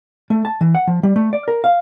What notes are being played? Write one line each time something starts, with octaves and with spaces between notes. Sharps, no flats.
A3
A5
E3
F#5
F3
G3
A3
D5
A#4
F5